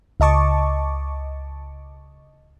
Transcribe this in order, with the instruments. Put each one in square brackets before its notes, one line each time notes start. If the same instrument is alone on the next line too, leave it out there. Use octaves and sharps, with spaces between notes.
[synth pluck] C#2 D#5 A5 C#6 D6